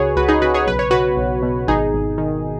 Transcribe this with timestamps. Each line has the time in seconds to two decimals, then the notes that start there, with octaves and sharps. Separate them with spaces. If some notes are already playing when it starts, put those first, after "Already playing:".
Already playing: C#2 C#3 F#4 G#4 B4 C#5
0.16 C#2 F#4 B4
0.28 D#4 G#4
0.42 C#3 F#4 B4
0.54 G#4 C#5
0.67 B1 B4
0.79 C#5
0.91 B2 F#4 B4
1.17 B1
1.43 B2
1.67 G#1 D#4 G#4
1.94 G#1
2.18 D#3